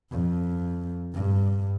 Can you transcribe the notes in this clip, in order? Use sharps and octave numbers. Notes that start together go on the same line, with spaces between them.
F2
G2